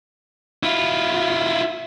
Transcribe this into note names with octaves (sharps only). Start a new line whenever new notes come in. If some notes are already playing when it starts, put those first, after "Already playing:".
E4 F4